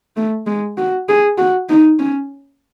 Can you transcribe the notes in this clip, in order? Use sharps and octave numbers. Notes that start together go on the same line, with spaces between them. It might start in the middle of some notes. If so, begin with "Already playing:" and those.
A3
G#3
F#4
G#4
F#4
D#4
C#4